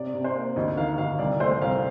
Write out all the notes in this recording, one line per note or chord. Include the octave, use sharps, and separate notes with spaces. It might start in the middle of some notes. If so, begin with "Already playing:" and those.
Already playing: C3 D5
C3
C5
A#3
D2 D#5
D#3 F5
D2 F5
C2 D5
A3 C5
C2 F5